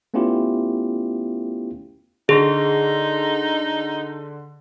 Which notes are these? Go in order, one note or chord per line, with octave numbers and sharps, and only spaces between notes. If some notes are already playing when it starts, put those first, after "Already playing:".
A3 B3 C#4 E4 F4 G4
D3 D#4 G#4 C6 A#6